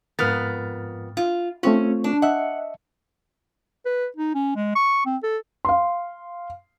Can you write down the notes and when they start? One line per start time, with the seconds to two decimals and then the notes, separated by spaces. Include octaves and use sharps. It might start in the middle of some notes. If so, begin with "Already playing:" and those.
0.19 F2 G#2 B3 A#4 F6 A6
1.17 F4
1.63 A3 C4 C#4 F4
2.04 D4
2.22 D#5 E5 F#5
3.85 B4
4.16 D#4
4.34 C#4
4.56 G#3
4.75 C#6
5.06 C4
5.23 A4
5.65 F5 C6